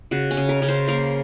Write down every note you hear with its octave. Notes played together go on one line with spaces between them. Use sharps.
C#3 F#4
C#4
C#3
A#4
C#3
C5
A#3 A#4